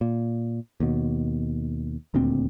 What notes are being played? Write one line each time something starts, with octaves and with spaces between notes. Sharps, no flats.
A#2
D#2 B2
D#1 D2 A#2 C4